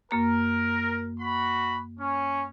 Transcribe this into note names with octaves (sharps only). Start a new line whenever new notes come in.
F#2 A#3 A#4 A#5
F#4 B5
C#4